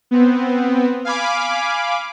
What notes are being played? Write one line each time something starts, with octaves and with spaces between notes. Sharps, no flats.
B3 C4
F5 G#5 B5 D6